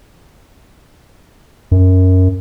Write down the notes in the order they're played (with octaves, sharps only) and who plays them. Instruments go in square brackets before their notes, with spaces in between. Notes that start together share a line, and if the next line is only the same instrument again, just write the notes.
[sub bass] F#2